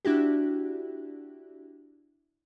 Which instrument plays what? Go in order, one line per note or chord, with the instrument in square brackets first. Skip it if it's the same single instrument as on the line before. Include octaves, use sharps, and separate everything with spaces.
[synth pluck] D4 E4 F#4 G4